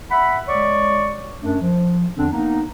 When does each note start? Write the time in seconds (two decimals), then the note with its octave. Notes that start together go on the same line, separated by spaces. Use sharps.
0.11 E5 F#5 B5
0.48 G#3 C#5 D5 C#6
1.42 F#2 A3 D4
1.61 F3
2.18 E2 D3 C4 D4
2.31 A#3 B3 D#4